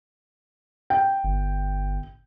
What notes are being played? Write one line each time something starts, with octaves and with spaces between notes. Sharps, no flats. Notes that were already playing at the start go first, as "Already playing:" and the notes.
G5
G1